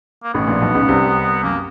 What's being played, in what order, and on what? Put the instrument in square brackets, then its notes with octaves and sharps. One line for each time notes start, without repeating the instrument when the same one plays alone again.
[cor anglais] A#3
[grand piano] A1 A2 [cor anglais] B3
[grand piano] A#1 A#2
B1 B2
C#2 C#3
C2 C3
[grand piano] F#2 [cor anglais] A#3